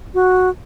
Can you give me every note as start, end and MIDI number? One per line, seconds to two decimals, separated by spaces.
0.14 0.49 66